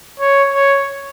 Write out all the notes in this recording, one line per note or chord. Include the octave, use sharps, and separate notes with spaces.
C#5
C#5